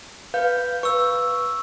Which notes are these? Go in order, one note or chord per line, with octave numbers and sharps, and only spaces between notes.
B4 F5 G6
B4 C#6 E6